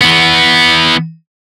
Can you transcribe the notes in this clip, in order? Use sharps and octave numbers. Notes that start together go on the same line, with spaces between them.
E3 B3